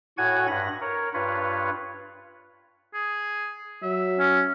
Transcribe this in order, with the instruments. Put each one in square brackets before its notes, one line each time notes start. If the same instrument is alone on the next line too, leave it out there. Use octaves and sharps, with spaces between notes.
[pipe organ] A2 F#4 C#5 F#5 G#5 G#6
G2 B5 A#6
A#4 C#5
G2 F4 B4 C#5
[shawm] G#4
[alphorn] F#3 [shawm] E5
[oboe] C#4